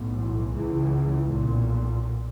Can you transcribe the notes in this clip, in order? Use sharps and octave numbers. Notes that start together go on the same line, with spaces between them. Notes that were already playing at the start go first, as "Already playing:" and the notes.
Already playing: B1 A2
E3
C#2 C#3
B1 A#2